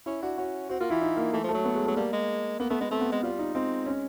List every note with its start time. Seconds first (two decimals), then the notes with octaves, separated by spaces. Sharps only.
0.06 C#4 E4
0.22 D4 F#4
0.38 C#4 F#4
0.69 C4 F#4
0.80 A#3 F4
0.90 E3 E4
1.02 D#4
1.17 A#3
1.33 E3 A3
1.44 F3
1.49 A3
1.54 F#3
1.65 B3
1.75 G#3
1.86 F#3 A3
1.96 G3 A#3
2.13 G#3
2.60 A#3 B3
2.70 A3 B3
2.81 G#3 B3
2.91 A3 C4
3.01 B3
3.12 G#3
3.23 G3 F4
3.39 D#4
3.54 G#3 C4
3.86 C#4